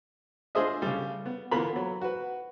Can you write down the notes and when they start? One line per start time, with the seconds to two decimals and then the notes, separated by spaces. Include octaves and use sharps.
0.55 D4 F4 G#4 C5 D#5 E5
0.82 C#3 G3
1.26 B3
1.51 D3 E3 A#3 B3 F4 B5
1.76 F#3
2.02 F#4 B4